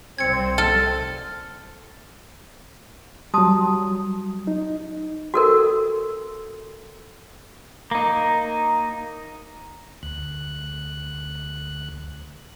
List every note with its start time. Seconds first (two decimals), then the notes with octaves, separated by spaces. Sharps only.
0.18 C2 C4 G#6 C#7
0.58 A4 F6
3.34 F#3 G3 A5 C6 D#6
4.47 D#4
5.34 F#4 A4 A#4
7.91 A#3 D#4
10.03 D2 F#6